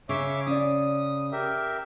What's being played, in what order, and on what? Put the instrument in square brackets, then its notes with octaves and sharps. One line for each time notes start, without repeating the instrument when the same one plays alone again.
[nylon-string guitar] C#3 [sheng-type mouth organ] C#5 E5 D6
[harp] C#4 D5 [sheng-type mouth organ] D#6
[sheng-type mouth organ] G4 A#4 E5